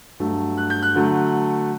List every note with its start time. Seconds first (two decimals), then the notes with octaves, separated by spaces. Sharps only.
0.20 G2 F#3 A3
0.58 F#6
0.70 G6
0.83 F#6
0.95 D3 F#3 A3